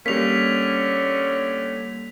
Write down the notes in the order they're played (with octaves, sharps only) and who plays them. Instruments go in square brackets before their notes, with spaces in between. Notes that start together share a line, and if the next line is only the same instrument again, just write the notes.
[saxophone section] A2 D3 C#4 [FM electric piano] G3 A#3 [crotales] B6 F7